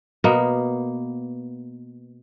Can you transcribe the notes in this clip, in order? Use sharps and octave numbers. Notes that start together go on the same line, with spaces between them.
B2 A#3 B3